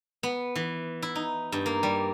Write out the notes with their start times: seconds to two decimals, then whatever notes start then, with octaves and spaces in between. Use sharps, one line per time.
0.23 B3
0.56 E3
1.02 E4
1.15 D#4
1.52 G2
1.66 A#3
1.83 G3